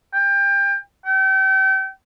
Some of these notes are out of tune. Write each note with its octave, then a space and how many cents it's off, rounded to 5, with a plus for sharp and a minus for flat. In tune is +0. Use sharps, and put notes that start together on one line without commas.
G5 +25
G5 -35